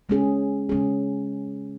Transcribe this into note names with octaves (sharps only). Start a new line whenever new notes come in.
C#3 G#3 C#4 G#4
C#3 G#3 C#4 G#4